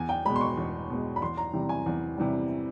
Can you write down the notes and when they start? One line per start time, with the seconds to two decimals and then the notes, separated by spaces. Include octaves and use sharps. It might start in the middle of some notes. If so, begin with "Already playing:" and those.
Already playing: E2 G#5
0.09 G5
0.25 B2 G#3 B5
0.36 C6
0.41 C#6
0.57 E2
0.90 B2 G#3
1.16 B5
1.22 E2 C6
1.37 A#5
1.53 C3 E3 G3
1.69 G#5
1.86 E2
2.17 C3 E3 G3